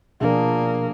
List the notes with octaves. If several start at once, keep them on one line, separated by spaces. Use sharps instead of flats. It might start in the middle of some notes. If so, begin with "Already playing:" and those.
B2 F3 A#3 D4 G#4 A#4